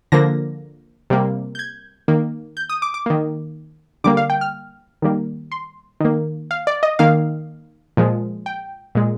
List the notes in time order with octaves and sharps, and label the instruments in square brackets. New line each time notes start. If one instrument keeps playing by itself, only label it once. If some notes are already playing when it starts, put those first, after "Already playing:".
[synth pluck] D3 F3 A#3 A#6
C3 G3 A#3
G6
G#6
D#3 A#3
G6
D#6
D6
D6
D#3 A#3
D3 G3 A#3 D6
F5
G5
F6
D#3 G3 A#3
C6
D#3 A#3
F5
D5
D#5
D#3 A#3 F5
A#2 F3 G#3
G5
A#2 G#3